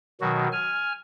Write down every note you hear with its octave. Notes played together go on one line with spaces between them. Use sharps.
B2 D#3 F#3 F#4
G#5 F6